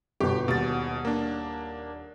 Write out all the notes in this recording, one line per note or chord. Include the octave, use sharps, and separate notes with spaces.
G1 B2 G4
D#1 B2 A6
A#3 D4